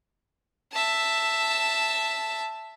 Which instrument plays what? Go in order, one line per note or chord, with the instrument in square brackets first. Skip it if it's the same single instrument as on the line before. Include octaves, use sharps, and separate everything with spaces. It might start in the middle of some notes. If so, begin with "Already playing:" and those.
[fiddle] E5 A5